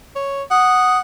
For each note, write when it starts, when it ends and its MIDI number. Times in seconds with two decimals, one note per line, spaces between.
0.16 0.43 73
0.51 1.01 78
0.51 0.99 87